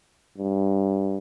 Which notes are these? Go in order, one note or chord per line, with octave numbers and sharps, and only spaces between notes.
G2